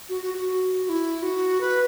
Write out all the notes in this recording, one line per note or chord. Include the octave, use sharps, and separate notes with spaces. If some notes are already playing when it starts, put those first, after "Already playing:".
F#4
F#4
F#4
F#4
E4
F#4
B4